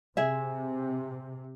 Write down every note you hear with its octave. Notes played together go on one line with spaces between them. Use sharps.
C3 G#4 E5